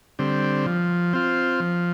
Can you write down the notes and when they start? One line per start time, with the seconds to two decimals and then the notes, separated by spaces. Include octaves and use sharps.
0.19 D3 G3 C4
0.66 F3
1.13 C4 F4
1.60 F3